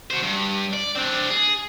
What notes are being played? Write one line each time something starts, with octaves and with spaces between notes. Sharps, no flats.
F#4 C5
G2
D5
C4 D4
G#4